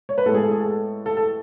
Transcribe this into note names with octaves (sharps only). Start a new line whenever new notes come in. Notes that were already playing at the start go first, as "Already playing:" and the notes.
C#5
B4
A2 G#3 B3 A4
G#4
A4
G#4
A4
A4
A4